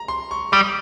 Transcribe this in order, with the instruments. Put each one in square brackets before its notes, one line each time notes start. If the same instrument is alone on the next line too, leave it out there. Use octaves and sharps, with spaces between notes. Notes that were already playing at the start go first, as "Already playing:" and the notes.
Already playing: [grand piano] A#5
C6
C#6
[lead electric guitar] G3 [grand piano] D#6